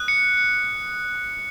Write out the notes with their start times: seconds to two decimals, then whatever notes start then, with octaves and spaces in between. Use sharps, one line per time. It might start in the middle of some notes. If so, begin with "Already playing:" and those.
Already playing: D#6 F#6
0.08 C#7
0.37 C#7